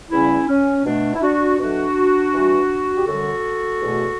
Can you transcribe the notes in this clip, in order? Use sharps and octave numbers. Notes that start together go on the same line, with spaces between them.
E2 C#3 G3 C#4 E4
C#4
B2 A3 D4
E4
D4 F#4
B2 F#3 A3 D4 F#4
G2 E3 G3
G4
F#2 D3 G3 F#4 A4
E2 B2 A3